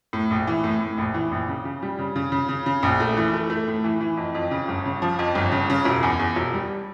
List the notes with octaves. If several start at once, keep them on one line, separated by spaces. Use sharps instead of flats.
A2
A#1
E3
A2
A2
A#1
E3
A#1
C#3
C#3
G3
C#3
C#3
C#3
C#3
C#3
A#1
A3
E3
A3
A3
A2
E3
E3
F2
F2
C#3
G1
C#3
F3
F2
G1
C#3
C#3
E1
E2
E2
E1
G3